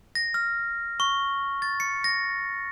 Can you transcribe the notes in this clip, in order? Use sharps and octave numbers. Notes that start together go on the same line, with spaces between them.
A#6
F6
C#6
A6
C#7
A#6